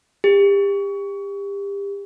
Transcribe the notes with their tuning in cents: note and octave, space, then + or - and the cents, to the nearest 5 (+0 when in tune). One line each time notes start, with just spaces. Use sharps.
G4 +30